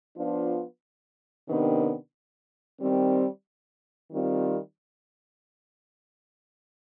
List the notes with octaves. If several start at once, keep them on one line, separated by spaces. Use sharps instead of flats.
F3 B3 D4 F4
C3 D#3 B3 D4
D#3 G3 C4
D#3 G3 C4 F4